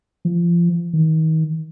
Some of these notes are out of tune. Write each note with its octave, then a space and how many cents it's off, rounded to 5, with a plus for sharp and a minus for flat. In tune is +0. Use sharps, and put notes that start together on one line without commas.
F3 -25
D#3 +35